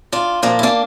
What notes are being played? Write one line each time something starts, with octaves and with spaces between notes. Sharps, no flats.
D4 F4
A#2 F3 A#3 D4
E4
A#3 D4